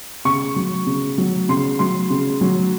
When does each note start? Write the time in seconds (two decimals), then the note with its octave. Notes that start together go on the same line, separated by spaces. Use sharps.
0.25 C#3 C#6
0.56 F#3
0.87 C#3
1.18 F#3
1.49 C#3 C6
1.79 F#3 C6
2.10 C#3
2.41 F#3